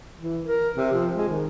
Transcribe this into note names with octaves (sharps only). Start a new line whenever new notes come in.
E3
A#4
C3
F3
G#3
D#3